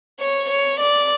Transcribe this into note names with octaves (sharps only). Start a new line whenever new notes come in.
C#5
C#5
D5